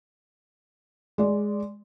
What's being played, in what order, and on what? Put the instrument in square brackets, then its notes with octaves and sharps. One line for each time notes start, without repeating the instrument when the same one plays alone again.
[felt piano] G#3 D5